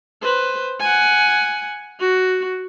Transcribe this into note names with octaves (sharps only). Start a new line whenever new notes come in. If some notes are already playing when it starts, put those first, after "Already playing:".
B4 C5
F#5 G#5
F#4